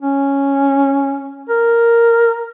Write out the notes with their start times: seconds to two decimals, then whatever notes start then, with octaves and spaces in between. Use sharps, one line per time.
0.01 C#4
1.49 A#4